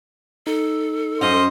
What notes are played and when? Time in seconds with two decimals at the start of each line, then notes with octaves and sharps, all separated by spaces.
0.47 D#4 A4
1.21 F#2 C#4 C5 D#5 F5